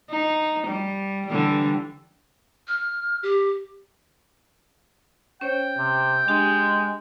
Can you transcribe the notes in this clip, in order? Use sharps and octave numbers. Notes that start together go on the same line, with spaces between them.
D#4
G3
D3 E3 G3
F6
G4
C#4 C5 C#5 G5
C3
G#3 D4 G4